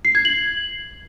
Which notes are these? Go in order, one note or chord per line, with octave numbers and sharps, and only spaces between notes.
C7
G#6
F#7